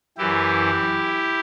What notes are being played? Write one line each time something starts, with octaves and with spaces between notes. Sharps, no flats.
F#2 E3 E4 G4